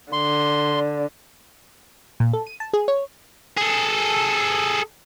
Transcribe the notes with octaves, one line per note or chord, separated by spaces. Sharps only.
D3 C6
A#2
A4
D#7
A5
G#4
C#5
G#4 A4